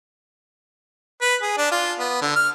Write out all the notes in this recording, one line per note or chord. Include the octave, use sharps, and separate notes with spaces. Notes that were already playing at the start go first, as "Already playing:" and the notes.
B4
G#4
D4
F4
B3
D3
F6